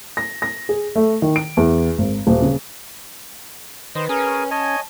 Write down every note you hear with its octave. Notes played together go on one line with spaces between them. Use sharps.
A#6
A#6
G#4
A3
D#3
D7
E2
G#1
D#1
C#3
D#3 B4 C5 D#5
C#4 G#4 A#4 G#5
C#5 D#5 G#5 A5